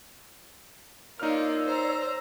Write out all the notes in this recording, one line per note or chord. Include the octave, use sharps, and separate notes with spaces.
A#3 D#4 F4 C#5 D5 E6 F6
C5 A#5